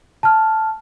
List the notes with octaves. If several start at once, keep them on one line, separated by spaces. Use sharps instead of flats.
A5 F6